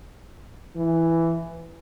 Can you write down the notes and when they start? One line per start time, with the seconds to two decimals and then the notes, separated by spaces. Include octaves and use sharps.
0.76 E3